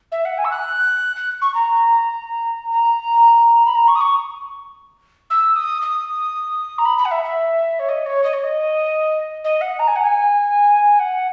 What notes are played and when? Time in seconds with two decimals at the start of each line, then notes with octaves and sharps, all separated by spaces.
0.11 E5
0.25 F#5
0.38 G#5
0.45 E6
0.51 F#6
1.16 F#6
1.41 C#6
1.54 A#5
2.71 A#5
3.65 B5
3.75 A#5
3.88 C#6
3.95 D#6
4.01 C#6
5.30 E6
5.56 D#6
5.82 D#6
6.78 A#5
6.85 B5
6.98 B5
7.05 F#5
7.11 E5
7.24 E5
7.79 C#5
7.89 D#5
8.06 C#5
8.24 D#5
8.33 C#5
8.43 D#5
9.44 D#5
9.61 F#5
9.79 A#5
9.87 G#5
9.96 F#5
10.03 G#5
10.99 F#5